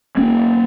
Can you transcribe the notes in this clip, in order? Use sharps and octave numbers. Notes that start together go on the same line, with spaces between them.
A#3 C#4